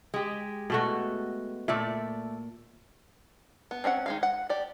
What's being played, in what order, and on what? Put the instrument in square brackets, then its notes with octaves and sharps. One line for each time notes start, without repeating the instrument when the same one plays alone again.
[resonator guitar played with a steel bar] G#3 G4
[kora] B2 A3 F#4
[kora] A#2 [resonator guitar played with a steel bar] A3 D5 E5
[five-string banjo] B3
C4 C#4 D#5 F#5
D#3 G#3 F5
F#5
G4 D5